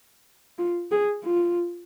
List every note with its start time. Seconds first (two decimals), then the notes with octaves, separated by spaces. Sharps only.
0.58 F4
0.92 G#4
1.24 F4